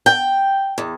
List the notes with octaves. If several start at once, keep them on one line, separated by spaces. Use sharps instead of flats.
G5
E2